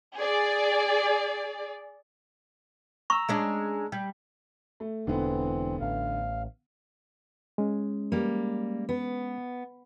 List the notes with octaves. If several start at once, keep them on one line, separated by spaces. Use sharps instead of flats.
G#4 D5
A#5 C#6 E6
G#3 C#4 D4
G3
A3
E1 D3 E3 B3 C4
A1 F5
G#3 C#4
G3 A#3
B3